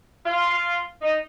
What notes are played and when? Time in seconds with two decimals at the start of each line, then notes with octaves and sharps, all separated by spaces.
0.26 F4
1.02 D#4